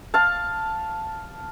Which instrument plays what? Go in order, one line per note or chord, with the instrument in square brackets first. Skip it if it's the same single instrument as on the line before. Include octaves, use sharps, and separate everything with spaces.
[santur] F5 A5